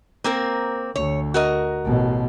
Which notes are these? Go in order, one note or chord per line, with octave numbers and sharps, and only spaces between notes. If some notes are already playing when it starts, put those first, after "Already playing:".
A#3 C4 A#4
D2 C#5
F#4 A#4 D#5
A1 B2